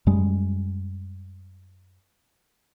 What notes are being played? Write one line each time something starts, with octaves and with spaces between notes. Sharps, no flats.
F#2 G3 G#3